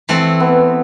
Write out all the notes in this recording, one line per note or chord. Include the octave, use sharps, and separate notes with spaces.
E3 A3 C4
B3